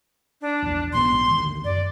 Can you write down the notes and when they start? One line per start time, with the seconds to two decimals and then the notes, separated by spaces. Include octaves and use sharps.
0.41 D4
0.62 A#1 E2
0.93 A#1 G#2 B3 C6
1.31 D2 D#3
1.64 F#2 D5